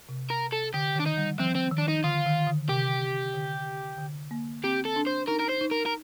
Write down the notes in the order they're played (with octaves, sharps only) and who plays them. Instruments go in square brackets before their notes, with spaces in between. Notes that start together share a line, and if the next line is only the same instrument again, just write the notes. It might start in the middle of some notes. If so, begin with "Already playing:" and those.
[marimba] C3
[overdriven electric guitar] A#4
A4
[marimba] D3 [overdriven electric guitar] G4
[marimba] D#3
[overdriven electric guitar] D4
D#4
[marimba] G3
[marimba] F3 [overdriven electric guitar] C4
[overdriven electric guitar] C4
[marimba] D#3
[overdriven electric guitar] D4
D#4
[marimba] D3 [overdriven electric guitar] F4
[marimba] D#3
D3
[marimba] C3 [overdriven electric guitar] G4
[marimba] D3
D3
A#3
[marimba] C4 [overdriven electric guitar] G4
[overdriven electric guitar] A4
[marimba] D4
[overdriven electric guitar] C5
[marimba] D#4 [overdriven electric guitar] A#4
[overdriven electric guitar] A#4
C5
[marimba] D#4
[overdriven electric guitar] A#4
A#4